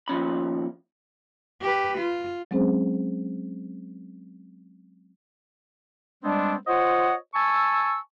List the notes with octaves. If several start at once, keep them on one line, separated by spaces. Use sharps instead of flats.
D#2 F3 C#4 B5
G4 B4
F4
F#3 G#3 C4 C#4 G#4 C5
G3 G#3 B3 C4 D4
F4 C5 C#5 D#5 F#5
G#5 A5 C#6 E6